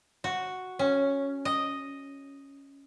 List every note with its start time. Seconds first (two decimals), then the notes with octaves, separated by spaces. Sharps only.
0.24 F#4
0.79 C#4
1.45 D#5